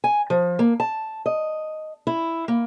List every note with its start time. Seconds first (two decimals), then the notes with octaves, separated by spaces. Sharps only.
0.04 G#5
0.30 F3
0.59 A#3
0.80 A5
1.26 D#5
2.07 E4
2.48 A#3